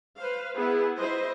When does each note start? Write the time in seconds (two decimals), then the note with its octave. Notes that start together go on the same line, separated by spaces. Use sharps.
0.18 B4 C5 F5
0.55 B3 E4 G#4
0.98 E4 C5 D#5